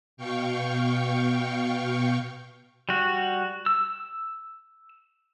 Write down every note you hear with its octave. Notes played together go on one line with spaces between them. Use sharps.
B2 F5 G5 C#6
G3 F#4
E6